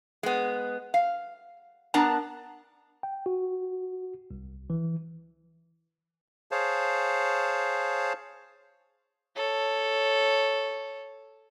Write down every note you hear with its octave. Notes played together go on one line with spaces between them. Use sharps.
G#3 B3
F5
B3 D4 A#4 A5 A#5
G5
F#4
C2
E3
G#4 C5 C#5 F5 A5
A4 C#5